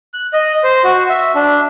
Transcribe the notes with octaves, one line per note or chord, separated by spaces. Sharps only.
F#6
D#5
C5
F#4
E5
D4